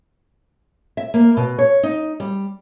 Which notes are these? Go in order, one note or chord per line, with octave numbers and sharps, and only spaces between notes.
E5
A#3
B2
C#5
D#4
G3